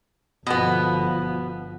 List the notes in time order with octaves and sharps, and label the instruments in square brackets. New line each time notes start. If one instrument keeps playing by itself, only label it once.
[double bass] G1 F3 [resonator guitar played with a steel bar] B2 B3